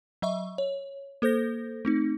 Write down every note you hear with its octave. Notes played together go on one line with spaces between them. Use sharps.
F#3 D#5 E5 C#6
C#5
A#3 A4 C5 G6 A#6
A3 C4 D#4